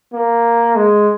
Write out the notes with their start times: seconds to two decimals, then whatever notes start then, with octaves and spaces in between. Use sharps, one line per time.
0.14 A#3
0.76 G#3